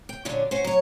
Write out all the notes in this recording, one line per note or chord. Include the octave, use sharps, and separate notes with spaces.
G5
A#2 D3 F#3 C#4 D4
C#4 F#4 C5
F#3 C#5